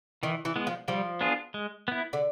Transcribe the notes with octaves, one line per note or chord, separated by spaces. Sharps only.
D#3 E3
E3
G#3 B3
F3
F3 G3
B3 D4 F4 G#4
G#3
B3 E4
D3